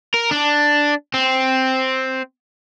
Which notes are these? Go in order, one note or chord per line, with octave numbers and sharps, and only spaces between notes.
A#4
D4
C4